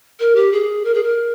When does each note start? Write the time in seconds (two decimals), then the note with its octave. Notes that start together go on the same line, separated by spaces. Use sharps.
0.20 A#4
0.35 G4
0.52 G#4
0.85 A#4
0.94 G#4
1.03 A#4